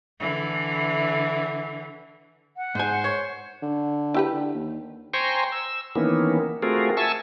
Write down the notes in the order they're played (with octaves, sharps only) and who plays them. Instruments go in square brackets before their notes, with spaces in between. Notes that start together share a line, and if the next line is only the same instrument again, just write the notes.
[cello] D3 E3
[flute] F#5
[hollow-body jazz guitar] G#2 G#5 [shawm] C5
[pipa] C#5
[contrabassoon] D3
[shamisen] E4 G4 B4
[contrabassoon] D3
D#2
[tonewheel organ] C5 G5 G#5 A#5 C6 C#6
E6
D#3 E3 A#3 B3 C#4
A3 C4 F4 F#4 G#4 A#4
E5 G#5 A5 C#6 E6